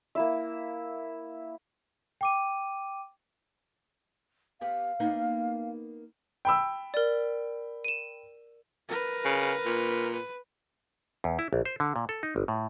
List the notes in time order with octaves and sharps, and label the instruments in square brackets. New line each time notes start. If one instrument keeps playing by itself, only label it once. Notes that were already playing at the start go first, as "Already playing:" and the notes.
[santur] A#3 E4 E5
[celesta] G5 D6 D#7
[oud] B3 G4 D5 [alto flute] F5
[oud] A#3 B3 D#4
[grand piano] G5 B5 E6
[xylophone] A#4 D5
D#7 E7
[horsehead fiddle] A#4 B4
[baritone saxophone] C#3
A#2
[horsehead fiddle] B4
[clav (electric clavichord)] E2
E4
A#1
C5
D3
A#2
A4
D#4
G1
A2